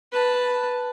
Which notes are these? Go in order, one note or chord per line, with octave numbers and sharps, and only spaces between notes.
B4 A5